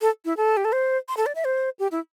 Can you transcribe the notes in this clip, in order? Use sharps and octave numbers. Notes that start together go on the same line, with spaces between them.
A4
E4
A4
G4
A4
C5
C6
A4
D5
E5
C5
G4
E4